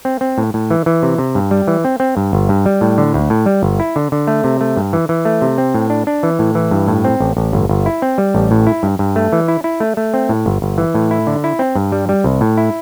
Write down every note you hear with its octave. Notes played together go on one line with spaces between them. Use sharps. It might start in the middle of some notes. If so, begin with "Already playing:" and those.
C4
C4
A2
A2
E3
E3
C3
C3
G2
G3
E3
C4
C4
G2
G1
G2
G3
A2
D3
D2
A2
G3
G1
E4
D3
D3
A3
C3
A3
G2
E3
E3
A3
C3
C4
A2
D4
D4
E3
A2
E3
G2
A2
C4
A1
A1
G1
G1
E4
C4
G3
A1
A2
E4
G2
G2
A3
E3
E4
E4
A3
A3
C4
A2
G1
G1
E3
A2
E4
D3
E4
C4
G2
G3
G3
C2
A2
E4